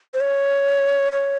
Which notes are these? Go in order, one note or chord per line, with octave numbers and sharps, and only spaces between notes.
C5
C#5
C#5